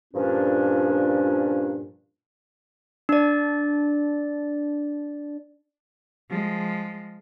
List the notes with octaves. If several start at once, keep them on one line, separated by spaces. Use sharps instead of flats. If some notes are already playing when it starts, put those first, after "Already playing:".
G2 A#2 F3 C#4 D4
D4 D5
F3 G#3